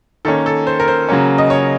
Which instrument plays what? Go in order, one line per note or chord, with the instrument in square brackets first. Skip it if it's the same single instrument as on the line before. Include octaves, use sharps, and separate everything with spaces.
[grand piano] D#3 A#3 C#4 A4
A4
C5
A#4
C5
C#3 F#3 A#3 C#4
D#5
C#5